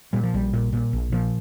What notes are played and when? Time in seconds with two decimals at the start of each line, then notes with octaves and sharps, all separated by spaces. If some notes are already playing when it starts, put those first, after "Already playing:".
0.13 A#2 G3
0.24 F3
0.34 A#1 G3
0.54 A#2
0.73 A#2
0.93 A#1
1.12 A#2 F3